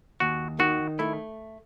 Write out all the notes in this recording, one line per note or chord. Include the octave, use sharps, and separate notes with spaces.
D#2 F#4
D#3 F#4
A3 E4